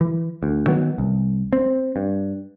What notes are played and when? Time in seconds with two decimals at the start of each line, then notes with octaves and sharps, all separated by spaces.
0.01 E3
0.43 D2
0.67 D#3 F#3 B3
0.98 C2
1.53 C4
1.96 G2